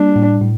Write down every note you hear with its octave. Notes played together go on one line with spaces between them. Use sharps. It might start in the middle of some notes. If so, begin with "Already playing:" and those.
Already playing: G3 A#3 D4
A2
A2